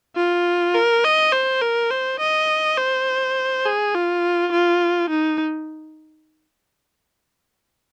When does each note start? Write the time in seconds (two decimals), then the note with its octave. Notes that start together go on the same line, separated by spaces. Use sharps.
0.16 F4
0.75 A#4
1.05 D#5
1.33 C5
1.62 A#4
1.91 C5
2.20 D#5
2.78 C5
3.66 G#4
3.95 F4
4.53 F4
5.10 D#4